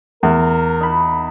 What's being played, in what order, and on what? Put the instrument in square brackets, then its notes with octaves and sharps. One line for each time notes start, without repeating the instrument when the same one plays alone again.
[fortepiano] E2 [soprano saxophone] A#4
[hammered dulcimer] D#4 B5